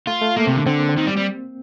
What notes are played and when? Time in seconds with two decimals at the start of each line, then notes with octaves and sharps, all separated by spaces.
0.07 A3 F4
0.21 A3
0.36 A3 A#3
0.45 C3 C4
0.52 D3 A#3
0.66 D3 C4
0.78 A#3
0.89 C4
0.97 D#3
1.06 G3
1.17 G3